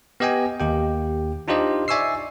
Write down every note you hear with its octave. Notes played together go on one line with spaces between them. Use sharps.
B3 G4 D#5 G5 G#5
D#2 G4 G5
D4 D#4 F4 G4 C5 D#5
D5 E5 G#5 C#6 E6 C7